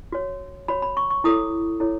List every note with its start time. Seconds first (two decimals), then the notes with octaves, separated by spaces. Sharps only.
0.12 F#4 C#5
0.68 F#4 C#5 B5
0.82 B5
0.97 C#6
1.10 C#6
1.24 E4 A4 C#5 D#6
1.80 E4 A4 C#5